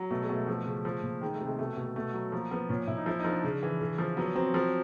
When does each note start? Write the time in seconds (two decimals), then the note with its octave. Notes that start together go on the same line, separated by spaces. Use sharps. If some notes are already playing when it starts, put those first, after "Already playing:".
Already playing: F#3
0.10 B2 A3
0.22 G#3
0.29 B2
0.35 A3
0.47 F3 A3
0.66 C#3
0.85 F3
1.03 A#2
1.21 D#3 G#3
1.34 A3
1.41 C3
1.47 G#3
1.58 B2 A3
1.76 B2
1.83 A3
1.96 B2 A3
2.14 F#3
2.32 F3 A#3
2.51 F3 B3
2.69 A#2 C#4
2.88 A#2 E4
2.97 D#4
3.06 F3 E4
3.19 D#4
3.24 F3
3.31 D4
3.44 C#3
3.63 E3
3.81 C#3
3.98 F3
4.17 F#3 B3
4.35 F#3 C4
4.54 F3